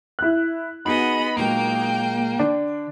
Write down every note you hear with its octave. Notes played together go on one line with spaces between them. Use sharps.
E4 F#6
B3 D#4 F#4 G#4 D#5 B5
A#2 F#3 G#3 A#3 G5
D3 D4